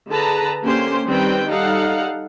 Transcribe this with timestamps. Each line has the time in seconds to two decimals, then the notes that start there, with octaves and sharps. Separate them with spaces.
0.10 D3 G#4 B4 A5 A#5
0.63 D3 A#3 C#4 G4 C5 C6
1.06 D#3 G3 C4 B4 G5
1.48 G3 D#4 A4 F5 F#5